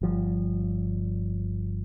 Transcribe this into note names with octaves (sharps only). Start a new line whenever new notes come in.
G1 F3 G3